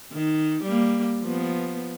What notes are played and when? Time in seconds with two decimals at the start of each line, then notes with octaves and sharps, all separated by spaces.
0.13 D#3
0.64 G3 A#3
1.22 F3 B3